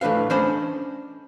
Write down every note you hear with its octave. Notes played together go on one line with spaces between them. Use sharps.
E3 A3 D4 B4 F5
C#4 D4 C5 D#5 B5